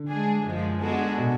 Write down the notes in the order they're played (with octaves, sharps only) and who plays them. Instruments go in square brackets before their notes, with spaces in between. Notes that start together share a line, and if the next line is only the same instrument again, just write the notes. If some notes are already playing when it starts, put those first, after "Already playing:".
Already playing: [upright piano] D3
[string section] G#3 D4 G#4
F#2 F3 G#3
G#3 B3 D4 F#4 A4
[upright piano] B2